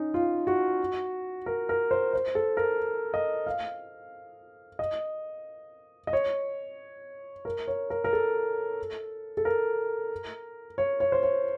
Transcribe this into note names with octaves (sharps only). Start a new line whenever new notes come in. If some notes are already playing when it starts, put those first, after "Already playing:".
Already playing: C#4 D#4
F4
F#4
A#4
A#4
C5
C5
A4
A#4
D#5
F5
D#5
D#5
C#5
A#4
C#5
A#4
A#4
A4
A4
A#4
C#5
C#5
C5
C#5